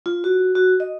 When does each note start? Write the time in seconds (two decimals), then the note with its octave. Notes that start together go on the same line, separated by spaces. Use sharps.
0.06 F4
0.24 F#4
0.55 F#4
0.80 D#5